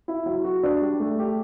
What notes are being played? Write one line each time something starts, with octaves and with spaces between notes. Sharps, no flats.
E4
F#3
F#4
D4
G3
A3
G4